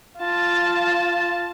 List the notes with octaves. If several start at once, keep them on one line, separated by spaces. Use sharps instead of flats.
F4 A5